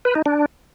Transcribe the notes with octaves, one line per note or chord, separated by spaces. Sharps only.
B4
D#4
D4